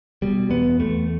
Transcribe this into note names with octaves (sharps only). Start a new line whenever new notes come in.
B2 G3
E2 B3
E2 A3